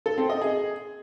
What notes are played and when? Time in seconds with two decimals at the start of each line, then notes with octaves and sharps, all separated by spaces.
0.06 A4
0.18 C4
0.30 D#5
0.42 G#4